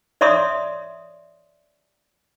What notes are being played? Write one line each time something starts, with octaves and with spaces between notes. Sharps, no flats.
C#5 D5 E5 C6 D#6